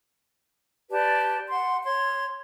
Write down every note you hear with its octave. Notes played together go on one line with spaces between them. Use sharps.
G4 B4 D5 A5
F#5 C6
C#5 C6